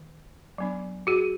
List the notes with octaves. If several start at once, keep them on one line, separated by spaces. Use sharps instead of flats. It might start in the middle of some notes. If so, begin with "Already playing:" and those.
Already playing: D#3
F#3 B3 D4
F#4 G#4